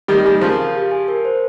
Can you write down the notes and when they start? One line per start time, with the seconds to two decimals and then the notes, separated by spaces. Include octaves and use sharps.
0.08 D#3 G3 G4
0.24 D#3 G3 G#5
0.41 C#3 F3 A#4
0.58 F5
0.75 G4
0.91 G#5
1.08 A#4
1.25 C5